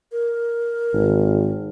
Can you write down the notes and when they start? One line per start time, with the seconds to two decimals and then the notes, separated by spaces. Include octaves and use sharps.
0.12 A#4
0.93 G#1